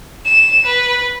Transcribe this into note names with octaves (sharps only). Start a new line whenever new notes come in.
E7
B4